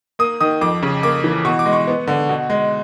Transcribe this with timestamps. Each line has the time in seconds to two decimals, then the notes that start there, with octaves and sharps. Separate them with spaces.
0.19 A#3 D#6
0.40 D#3 D#6
0.61 F2 D6
0.83 C#3
1.03 A#3 D6
1.24 E3
1.45 B2 C#6
1.59 D6
1.66 G#3
1.73 C#6
1.87 B3
2.07 D3
2.29 B2
2.50 G#3